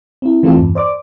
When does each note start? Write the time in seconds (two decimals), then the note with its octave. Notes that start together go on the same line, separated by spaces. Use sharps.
0.22 C4 E4
0.43 E3 A3 C4 F4 A4
0.57 E2 G2
0.75 C5 D5 D6